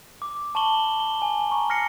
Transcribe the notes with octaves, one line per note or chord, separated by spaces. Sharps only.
D6
A5 B5 C#6 E7 F#7 G7
G7
G#5
A#5 C#6
F6 A#6 C7 C#7